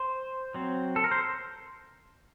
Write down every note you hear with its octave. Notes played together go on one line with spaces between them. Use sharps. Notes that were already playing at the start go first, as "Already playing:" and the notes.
Already playing: C5
F#3 C4
A4
A#4
C5